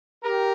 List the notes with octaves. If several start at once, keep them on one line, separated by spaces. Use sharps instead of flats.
G4 A#4